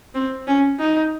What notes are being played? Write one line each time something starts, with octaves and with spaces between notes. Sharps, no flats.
C4
C#4
D#4